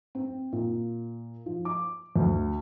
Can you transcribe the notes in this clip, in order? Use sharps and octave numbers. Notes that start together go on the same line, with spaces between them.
C4
A#2
F3
D6
D2